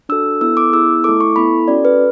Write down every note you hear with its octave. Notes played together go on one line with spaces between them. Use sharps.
D4 F#4 A4 E6
B3 E4 A4 E6
D6
B3 E4 G#4 E6
A3 E4 A4 D6
C#6
B3 E4 A4 B5
C#4 F#4 A4 D5
B4